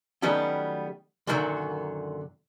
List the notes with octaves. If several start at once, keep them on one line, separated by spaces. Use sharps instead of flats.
D#3 F#3 G3 A3 B3 C#4
F#2 A#2 D3 D#3 F3 F#3